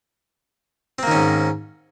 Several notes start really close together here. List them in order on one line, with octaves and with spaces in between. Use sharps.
C4 A#3 D#3 C#4 G#2